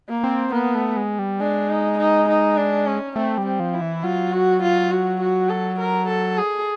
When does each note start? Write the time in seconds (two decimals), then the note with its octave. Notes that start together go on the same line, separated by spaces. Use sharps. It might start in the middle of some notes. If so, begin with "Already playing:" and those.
0.09 A#3
0.24 C4
0.52 A#3 B3
0.75 A3
0.97 G#3
1.19 G3
1.40 G#3 D4
1.69 D#4
1.98 D#4
2.28 D#4
2.57 D4
2.86 C#4
3.16 A3 C4
3.38 G3
3.45 C4
3.60 F3
3.74 E4
3.82 E3
4.03 F#3 F4
4.33 F#4
4.63 F4
4.91 F#4
5.21 F#4
5.49 A4
5.79 A#4
6.08 A4
6.38 G#4